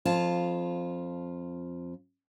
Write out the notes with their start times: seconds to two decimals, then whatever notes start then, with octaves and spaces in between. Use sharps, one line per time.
0.05 F2 F4 A5